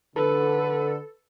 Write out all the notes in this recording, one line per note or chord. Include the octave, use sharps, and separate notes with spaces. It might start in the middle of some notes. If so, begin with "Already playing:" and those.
D3 A4 B4